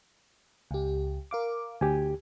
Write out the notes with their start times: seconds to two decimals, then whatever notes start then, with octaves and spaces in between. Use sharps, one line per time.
0.71 C#2 G4
1.31 A#4 F5 D6
1.81 D2 G4 G#5